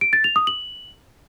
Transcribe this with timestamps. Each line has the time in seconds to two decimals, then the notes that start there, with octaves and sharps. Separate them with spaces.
0.01 D7
0.13 A6
0.24 F7
0.36 D#6
0.47 F#7